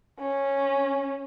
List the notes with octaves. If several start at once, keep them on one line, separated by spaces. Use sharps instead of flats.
C#4